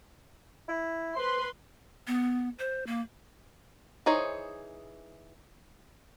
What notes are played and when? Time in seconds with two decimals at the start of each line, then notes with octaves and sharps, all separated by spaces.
0.68 E4
1.16 B4 C5 C6
2.07 B3
2.59 C5
2.87 A#3
4.06 E3 D#4 G#4 C5 C#5